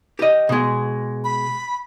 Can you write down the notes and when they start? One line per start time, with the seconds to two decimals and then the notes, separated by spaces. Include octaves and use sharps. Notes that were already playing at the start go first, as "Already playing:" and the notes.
0.19 G4 D#5
0.49 B2 G#3
1.24 B5